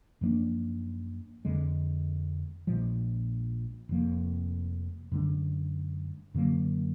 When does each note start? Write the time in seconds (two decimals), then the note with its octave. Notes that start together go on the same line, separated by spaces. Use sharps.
0.21 F#2 F3 A#3 D4
1.45 F2 D3 G#3
2.67 A#1 A#2 F3 G#3
3.89 F1 F2 F3 A#3
5.12 F#2 D3 G#3 D4
6.34 F#2 D3 F#3 A#3